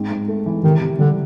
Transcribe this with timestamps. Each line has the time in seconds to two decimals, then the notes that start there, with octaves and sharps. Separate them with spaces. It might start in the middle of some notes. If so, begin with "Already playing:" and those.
Already playing: G#2 C4
0.11 G#2
0.28 A3
0.46 E3
0.63 C3 D#3
0.81 C3
0.99 D3 G3